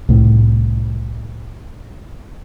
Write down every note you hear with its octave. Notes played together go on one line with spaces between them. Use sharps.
C2 A2